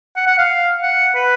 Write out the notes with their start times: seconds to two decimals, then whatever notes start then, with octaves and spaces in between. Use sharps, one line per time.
0.16 F#5
0.27 F#5
0.38 F5
0.83 F#5
1.15 B4